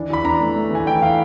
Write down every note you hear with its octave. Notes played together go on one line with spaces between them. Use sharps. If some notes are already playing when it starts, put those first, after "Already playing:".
Already playing: E3 D4
E3 B5
D4 A#5
A3
A3
E3 G#5
E3 G5
E3 F5